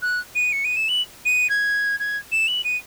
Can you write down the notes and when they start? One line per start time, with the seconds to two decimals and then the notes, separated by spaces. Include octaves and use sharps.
0.02 F#6
0.35 D#7
0.52 C#7
0.64 D#7
0.76 E7
0.89 F#7
1.25 D#7
1.49 G#6
1.99 G#6
2.32 E7
2.47 F#7
2.64 D#7